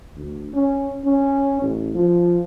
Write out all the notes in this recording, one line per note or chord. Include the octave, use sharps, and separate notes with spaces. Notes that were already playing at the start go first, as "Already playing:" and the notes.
D2
C#4
C#4
A1
F3